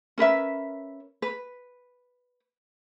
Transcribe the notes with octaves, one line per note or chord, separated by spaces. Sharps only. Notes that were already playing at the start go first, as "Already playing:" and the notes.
C#4 A#4 B4 E5
B4